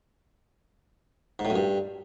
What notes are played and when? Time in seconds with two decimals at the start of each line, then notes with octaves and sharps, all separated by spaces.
1.39 G#2
1.45 A2
1.50 F#2
1.56 G2